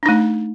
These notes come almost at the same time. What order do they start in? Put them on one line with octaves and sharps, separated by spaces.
D4 D#4 A3